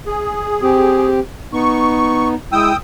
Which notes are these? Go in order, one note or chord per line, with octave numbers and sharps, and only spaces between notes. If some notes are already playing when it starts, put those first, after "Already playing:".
G#4
C4 G4
B3 D#4 C#6
G#3 E4 G5 D#6 E6